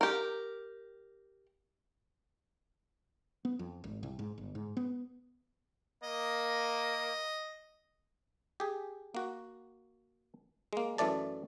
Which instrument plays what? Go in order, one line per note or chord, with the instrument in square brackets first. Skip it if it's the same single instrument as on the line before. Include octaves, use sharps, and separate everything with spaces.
[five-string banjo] G4 A#4
[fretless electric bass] B3
F2
G#1
C2
G#2
G1
G#2
B3
[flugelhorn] A#3 [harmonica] D#5
[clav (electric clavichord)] G4 G#4
A#3 F#4
G#3 A#3
F#2 E3 A3 D5 A5